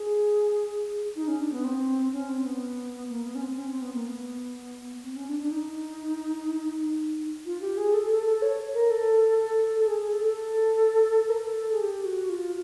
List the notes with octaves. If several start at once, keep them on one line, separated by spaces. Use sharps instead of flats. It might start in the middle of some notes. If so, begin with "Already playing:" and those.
Already playing: G#4
D#4
C#4
D4
B3
C4
C#4
C4
B3
A#3
B3
C#4
C4
C#4
C4
B3
A#3
B3
C4
C#4
D4
D4
D#4
F4
G4
G#4
A4
A4
A4
C#5
A#4
A4
A4
A4
G#4
G#4
A4
A4
A#4
A4
G#4
G4
F#4
F4